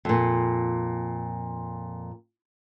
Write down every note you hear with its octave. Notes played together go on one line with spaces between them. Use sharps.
F2 A#2